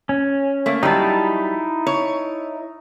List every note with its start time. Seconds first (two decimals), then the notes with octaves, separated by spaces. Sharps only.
0.09 C#4
0.66 A3 A#3
0.83 F#3 G3 D#4 E4 A5
1.87 C#5